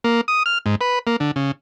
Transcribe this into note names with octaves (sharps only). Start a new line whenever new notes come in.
A#3
D#6
F6
G#2
B4
A#3
D3
C#3